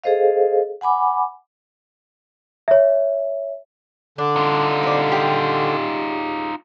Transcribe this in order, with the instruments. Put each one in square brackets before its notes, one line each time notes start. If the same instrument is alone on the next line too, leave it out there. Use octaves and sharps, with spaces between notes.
[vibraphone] G#4 A4 C5 D#5 F5
F#5 G#5 B5 D6
[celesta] C#5 E5
[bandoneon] D3 [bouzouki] D4
[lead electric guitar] D#4 F4
[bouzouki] C4 D5
G4 G#4